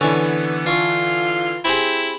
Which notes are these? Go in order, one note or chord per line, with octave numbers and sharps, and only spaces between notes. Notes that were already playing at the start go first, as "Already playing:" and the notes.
D3 E3 B3 C#4 D5 G#5
D4 F4 C#6
C4 E4 G4 G#4